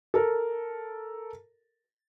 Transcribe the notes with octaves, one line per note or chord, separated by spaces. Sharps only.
A4 A#4